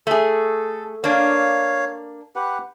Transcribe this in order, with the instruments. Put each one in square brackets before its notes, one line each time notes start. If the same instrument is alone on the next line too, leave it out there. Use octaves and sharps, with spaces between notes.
[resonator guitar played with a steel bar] A3 G#4 [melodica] A4
[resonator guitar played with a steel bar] A#3 D4 [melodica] C#5 F5
[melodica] G4 B4 F#5